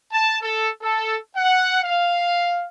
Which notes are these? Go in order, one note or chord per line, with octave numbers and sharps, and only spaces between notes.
A5
A4
A4
F#5
F5